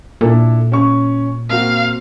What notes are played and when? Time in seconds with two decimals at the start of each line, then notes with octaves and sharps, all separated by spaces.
0.21 A#2 D4 E4 A4
0.72 C#4 C#6
1.49 A#3 C4 F#4 F5